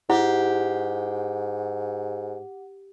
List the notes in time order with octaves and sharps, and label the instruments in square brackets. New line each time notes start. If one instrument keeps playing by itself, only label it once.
[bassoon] G#2 [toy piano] E4 [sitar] G4 [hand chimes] F#5